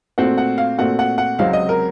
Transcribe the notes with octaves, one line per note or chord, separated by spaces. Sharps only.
A#2 A3 C4 F#4 F#5
F#5
F5
A#2 A3 C4 F#4 F#5
F#5
F#5
C#2 C3 F#3 C4 F5
D#5
A#4